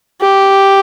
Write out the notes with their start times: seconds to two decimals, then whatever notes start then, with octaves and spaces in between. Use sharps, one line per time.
0.20 G4